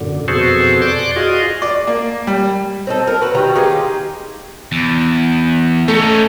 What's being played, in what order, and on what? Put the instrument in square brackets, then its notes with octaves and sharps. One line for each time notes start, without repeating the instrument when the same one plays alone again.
[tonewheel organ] F#2 A#2 D3
F2 B2 F#4 G#4 A4 C5
D5 C6 D6 F#6
F4 F#4 G#4 D#5
[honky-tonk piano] D5
A#3
G3
[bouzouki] C4 D#4 A4
A#4
F#4 B4
D#3 G3 F#4 A#5
D#4 F4 G4 G#4
[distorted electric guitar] E2
[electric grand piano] A3 [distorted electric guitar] C#4 D#4